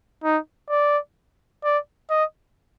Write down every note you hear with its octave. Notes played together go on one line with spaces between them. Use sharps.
D#4
D5
D5
D#5